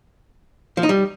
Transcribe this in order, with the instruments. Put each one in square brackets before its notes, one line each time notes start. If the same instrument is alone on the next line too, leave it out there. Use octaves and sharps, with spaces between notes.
[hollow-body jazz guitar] F3
D#4
G3